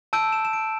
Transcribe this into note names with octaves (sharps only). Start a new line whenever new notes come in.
A5 E6 G6 D7
E7
E7
D7